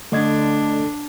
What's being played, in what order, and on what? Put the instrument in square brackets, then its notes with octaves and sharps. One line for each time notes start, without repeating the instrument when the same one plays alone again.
[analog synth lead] D3 [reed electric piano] A3 D#5 G#6 [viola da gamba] D4